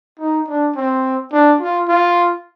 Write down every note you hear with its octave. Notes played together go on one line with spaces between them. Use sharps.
D#4
D4
C4
D4
F4
F4